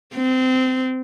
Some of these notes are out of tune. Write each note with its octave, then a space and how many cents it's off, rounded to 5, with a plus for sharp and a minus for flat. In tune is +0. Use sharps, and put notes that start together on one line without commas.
C4 -20